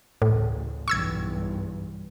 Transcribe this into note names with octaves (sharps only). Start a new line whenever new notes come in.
A1 D2 A2 C#3
B1 E2 G2 C#6 E6 G#6